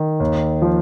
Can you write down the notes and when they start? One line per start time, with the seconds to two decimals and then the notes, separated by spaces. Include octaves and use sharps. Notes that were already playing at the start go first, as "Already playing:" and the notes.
Already playing: D#3
0.20 D#2
0.62 F3